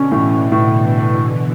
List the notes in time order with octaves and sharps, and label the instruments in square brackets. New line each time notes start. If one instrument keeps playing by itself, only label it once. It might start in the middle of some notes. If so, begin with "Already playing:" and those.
Already playing: [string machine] B2 D3 [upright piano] C#4
[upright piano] A2 [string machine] E3
[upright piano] A2